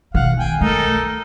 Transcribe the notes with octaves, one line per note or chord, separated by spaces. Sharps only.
B1 D#3 F5 F#5
G5 G#5
A3 D#4 A4 A#4